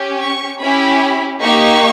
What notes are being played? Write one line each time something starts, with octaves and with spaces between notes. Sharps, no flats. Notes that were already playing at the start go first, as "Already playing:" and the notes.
Already playing: C#4 G4
C#6
C#4 E4 G4 B5
A#3 D#4 G4 C#6